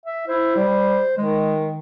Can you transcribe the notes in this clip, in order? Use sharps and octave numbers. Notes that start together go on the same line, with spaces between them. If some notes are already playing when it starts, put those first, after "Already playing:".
E5
E4 C5
G3
D#3 G#3